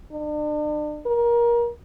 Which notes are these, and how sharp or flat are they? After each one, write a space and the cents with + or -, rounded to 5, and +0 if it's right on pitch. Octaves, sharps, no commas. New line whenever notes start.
D4 +40
A#4 +25